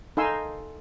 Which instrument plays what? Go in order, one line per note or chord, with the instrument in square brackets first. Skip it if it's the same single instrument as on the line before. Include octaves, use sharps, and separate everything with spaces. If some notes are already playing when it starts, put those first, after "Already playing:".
[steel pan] D#4 A4 F5 G#5 C6 E6